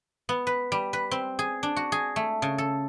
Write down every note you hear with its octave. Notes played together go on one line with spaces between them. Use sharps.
B3
B4
G3
B4
C4
G#4
D4
F#4
G#4
A3
C#3
A4